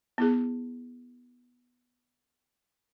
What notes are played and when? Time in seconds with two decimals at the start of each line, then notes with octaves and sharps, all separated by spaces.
0.18 B3 E4 G#4